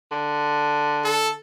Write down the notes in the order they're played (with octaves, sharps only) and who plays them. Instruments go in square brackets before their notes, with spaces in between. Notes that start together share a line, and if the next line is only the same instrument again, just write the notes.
[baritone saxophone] D3
[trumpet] A4